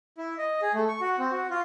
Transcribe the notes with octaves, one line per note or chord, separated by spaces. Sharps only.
E4
D#5
G#4
A3
C#6
F#4
C4
F#4
F4